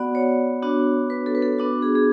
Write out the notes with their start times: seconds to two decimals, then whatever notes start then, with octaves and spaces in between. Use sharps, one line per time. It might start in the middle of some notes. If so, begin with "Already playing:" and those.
Already playing: B3 F#4 D5 F#5
0.15 C#5
0.62 B3 D4 F#4
1.10 B4
1.26 A4
1.35 B4
1.42 A4
1.58 B3 D4 F#4
1.82 G#4
1.95 G#4